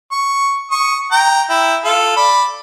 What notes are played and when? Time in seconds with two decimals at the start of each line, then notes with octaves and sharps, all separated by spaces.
0.12 C#6
0.71 C#6 D#6
1.12 G5 A#5
1.49 E4 G5
1.84 F4 A4
2.17 D5 B5